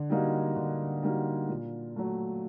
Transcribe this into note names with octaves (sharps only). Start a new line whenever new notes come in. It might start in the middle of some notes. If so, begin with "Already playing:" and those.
Already playing: D3
G3 A#3 D#4 F#4
D3
G3 A#3 D#4 F#4
A#2
F#3 A3